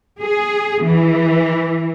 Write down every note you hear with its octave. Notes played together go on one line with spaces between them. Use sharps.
G#4
E3